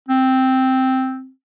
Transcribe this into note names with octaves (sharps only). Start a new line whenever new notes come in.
C4